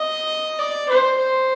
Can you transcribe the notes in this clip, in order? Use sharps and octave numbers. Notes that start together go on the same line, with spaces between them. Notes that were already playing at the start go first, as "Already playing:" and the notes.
Already playing: D#5
D5
C5
C5